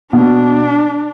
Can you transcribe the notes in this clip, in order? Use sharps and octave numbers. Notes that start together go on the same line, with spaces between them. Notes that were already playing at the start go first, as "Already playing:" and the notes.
B2 D4